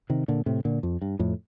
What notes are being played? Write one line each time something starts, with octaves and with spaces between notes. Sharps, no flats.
C3 D#3
A#2 D3
A2 C3
A#2 D3
F2
G2
F2 A2